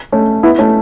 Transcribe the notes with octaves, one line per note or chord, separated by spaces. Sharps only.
A3 C#4
B3 E4
A3 C#4